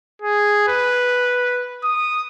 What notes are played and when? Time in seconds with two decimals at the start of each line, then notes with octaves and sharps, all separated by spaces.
0.22 G#4
0.68 B4
1.84 D#6